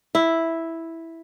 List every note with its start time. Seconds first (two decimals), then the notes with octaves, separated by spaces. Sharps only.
0.15 E4